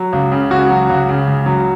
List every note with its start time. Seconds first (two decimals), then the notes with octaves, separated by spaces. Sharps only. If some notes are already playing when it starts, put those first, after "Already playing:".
Already playing: F#3
0.13 C#2
0.32 C#3
0.50 C#2 F#4
0.70 F#3
0.90 C#2
1.09 C#3
1.28 C#2
1.46 F#3